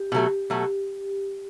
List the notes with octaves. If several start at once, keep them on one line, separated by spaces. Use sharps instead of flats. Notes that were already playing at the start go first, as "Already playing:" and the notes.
Already playing: G4
B2 F#3 A3
B2 F#3 A3